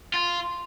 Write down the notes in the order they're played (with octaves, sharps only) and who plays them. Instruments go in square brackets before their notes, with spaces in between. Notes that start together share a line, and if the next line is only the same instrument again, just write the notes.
[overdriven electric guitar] F4